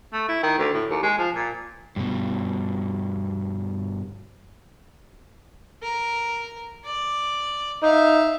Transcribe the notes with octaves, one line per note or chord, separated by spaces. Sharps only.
A3
E4
D#3
D2
A2
D#2
G#3
F3
A#2
G2 B2
A#4
D5
D#4 E5 F5